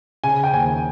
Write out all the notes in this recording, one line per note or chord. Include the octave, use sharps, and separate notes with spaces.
C#3 G#5
G5
D#2 G#5